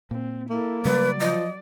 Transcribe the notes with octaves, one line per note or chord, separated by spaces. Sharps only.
A#2 C4
A#3 E4 A4
C#3 F#3 G3 A3 B4 D5
F3 D#5